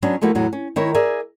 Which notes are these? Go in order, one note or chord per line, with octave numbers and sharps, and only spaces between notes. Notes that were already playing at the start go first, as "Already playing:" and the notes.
F#3 B3 C#4 D4
F3 A3 A#3 E4 F#4
E2 A2 F#3 B3
C#4
D#3 E4 A#4 C#5
G#4 A#4 D5 E5